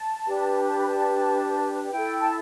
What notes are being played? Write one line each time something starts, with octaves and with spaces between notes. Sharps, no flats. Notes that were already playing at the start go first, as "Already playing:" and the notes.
Already playing: A5
D4 G4 B4
A5
B5
A5
E4 A4 G5
A5